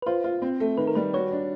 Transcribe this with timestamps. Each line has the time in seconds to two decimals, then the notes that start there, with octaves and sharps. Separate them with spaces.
0.02 B4
0.06 F4 C5
0.24 F4
0.42 C4
0.60 A3
0.77 D#3 B4
0.87 A#4
0.95 G3 B4
1.14 F#4 C#5
1.32 D4